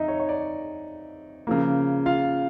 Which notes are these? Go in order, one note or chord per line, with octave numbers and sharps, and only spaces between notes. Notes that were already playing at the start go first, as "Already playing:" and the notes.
Already playing: F2 D#4 D#5 E5
C#5
C#5
D5
C#3 F3 A#3
F4 F5